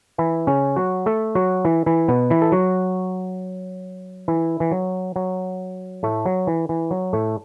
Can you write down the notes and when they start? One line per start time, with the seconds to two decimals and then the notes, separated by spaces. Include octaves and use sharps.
0.18 E3 E4
0.47 C#3 C#4
0.76 F#3 F#4
1.06 A3 A4
1.35 F#3 F#4
1.65 E3 E4
1.86 E3 E4
2.08 B2 B3
2.30 E3 E4
2.42 A4
2.52 F#3 F#4
4.28 E3 E4
4.60 E3
4.72 F#3
5.16 F#3
6.03 A2 A3
6.26 F#3
6.47 E3
6.69 E3
6.91 F#3
7.13 A2 A3